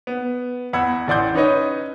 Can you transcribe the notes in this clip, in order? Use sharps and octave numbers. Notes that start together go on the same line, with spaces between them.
B3
E2 F#5 B5 E6 G#6
A1 E3 D5 F#5 C6 G6
C#4 D#4 B4 C#5 D#5